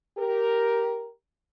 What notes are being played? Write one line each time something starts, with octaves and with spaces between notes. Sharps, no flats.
G4 A#4